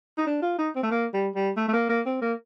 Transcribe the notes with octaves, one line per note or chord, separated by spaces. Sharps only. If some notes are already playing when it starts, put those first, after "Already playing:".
D#4
D4
F4
D#4
C4
A3
A#3
G3
G3
A3
A3
A#3
A#3
C4
A#3